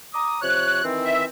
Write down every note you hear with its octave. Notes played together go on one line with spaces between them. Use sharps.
A#5 D6 D#6
C3 F3 C#5 F#6
D#3 E3 C4
E5